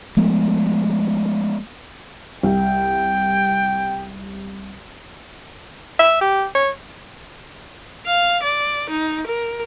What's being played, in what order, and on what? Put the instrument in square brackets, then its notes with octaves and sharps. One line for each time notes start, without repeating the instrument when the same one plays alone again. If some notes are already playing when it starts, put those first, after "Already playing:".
[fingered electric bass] F3 G#3 A3 B3
[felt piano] C2 [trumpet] G5
[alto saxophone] E5
G4
C#5
[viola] F5
D5
D#4
A#4